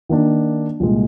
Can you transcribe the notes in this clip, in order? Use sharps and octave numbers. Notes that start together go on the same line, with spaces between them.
D#3 A#3 D4
C2 A#2 G#3